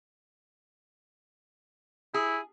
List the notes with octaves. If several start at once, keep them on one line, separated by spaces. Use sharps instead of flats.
E4 G#4